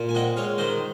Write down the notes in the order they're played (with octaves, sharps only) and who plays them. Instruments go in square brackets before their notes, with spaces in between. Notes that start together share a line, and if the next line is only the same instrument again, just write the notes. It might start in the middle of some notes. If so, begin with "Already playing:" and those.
Already playing: [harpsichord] A#2
G#5
C4 D#5 F#5
G#3 C#5 F5
D#3 C5 D#5